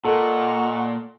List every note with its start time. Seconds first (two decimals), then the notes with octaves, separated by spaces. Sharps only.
0.05 A#2 A4 D#5 F#5 C#6